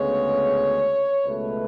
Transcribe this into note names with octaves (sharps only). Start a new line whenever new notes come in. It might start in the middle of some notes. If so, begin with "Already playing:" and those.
Already playing: D2 C#3 G#3 B3 C#5
C#2 B2 A3 B4